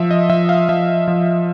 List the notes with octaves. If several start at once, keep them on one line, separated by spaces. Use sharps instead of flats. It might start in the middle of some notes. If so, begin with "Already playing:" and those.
Already playing: F3 E5
D#5
F3 E5
F5
F3 E5
F3